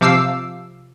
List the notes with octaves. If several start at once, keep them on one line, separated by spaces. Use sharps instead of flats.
C3 F3 F5 D6 E6 C7